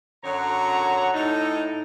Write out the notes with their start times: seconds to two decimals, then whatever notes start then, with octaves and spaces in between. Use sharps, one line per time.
0.24 F#2 D3 F#3 C#5 F#5 A#5
1.14 A2 D#4 A4